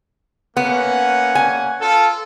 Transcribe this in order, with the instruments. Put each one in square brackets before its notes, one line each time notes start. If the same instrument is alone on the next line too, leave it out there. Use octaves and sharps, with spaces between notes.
[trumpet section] A#3 C#4 F#5 [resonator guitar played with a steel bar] B3
[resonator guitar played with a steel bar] G#5
[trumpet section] F4 A4